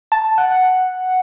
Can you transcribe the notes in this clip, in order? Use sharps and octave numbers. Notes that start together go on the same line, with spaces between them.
A5
F#5